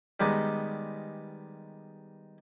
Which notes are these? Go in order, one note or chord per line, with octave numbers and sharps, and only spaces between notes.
D#3 G3 G#3 B3 D#4